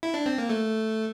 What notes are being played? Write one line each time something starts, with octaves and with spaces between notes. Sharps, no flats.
E4
D4
C4
A#3
A3